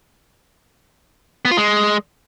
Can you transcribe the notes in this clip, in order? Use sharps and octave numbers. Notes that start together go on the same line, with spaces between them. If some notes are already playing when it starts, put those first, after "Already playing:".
B3
F4
G#3